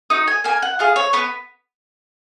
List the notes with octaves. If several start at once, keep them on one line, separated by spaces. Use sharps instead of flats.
D#4 F#4 D#6
G#5
A#3 G#5
F#5
F4 G#4 F5
C#5
B3 B4